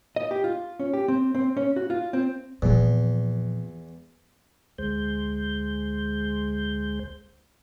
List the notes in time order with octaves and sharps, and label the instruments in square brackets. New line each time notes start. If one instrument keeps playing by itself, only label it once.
[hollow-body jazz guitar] D#5
G4
F4
C#4
G4
C4
C4
C#4
F#4
F4
C4
[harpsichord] E2 [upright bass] A#2 F3
[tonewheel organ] D2 G#3 C5 G6